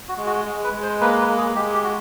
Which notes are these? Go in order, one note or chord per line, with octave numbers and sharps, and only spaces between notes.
F#4
G#3
F#4
G#3
B4
G#3
C5
A#3 B4
B4
A#3
G#4
G#3 G4
G4
F#4